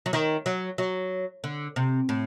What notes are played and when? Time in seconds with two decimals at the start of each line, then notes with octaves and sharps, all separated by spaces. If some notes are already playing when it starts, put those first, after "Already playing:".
0.06 F#3
0.13 D#3
0.46 F#3
0.78 F#3
1.44 D3
1.76 C3
2.09 A2